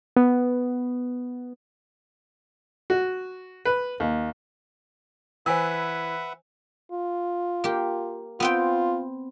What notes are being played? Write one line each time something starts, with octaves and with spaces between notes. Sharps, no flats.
B3
F#4
B4
D#2
E3 B4 C5 E5 F#5 G#5 E6
F4
A#3 G4
B3 C4 F4 G5